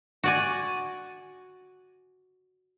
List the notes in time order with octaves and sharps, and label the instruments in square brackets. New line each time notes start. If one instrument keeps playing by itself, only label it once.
[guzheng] F#4 D5 G#5